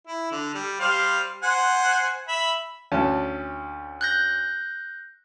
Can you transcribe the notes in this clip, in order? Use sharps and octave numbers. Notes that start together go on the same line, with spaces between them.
E4
D3
G3
G3 C5 F5
C5 F#5 G#5
E5 B5
D2 C#4 A5
F#6 G6 A#6